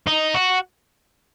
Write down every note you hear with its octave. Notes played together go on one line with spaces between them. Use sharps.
D#4
F#4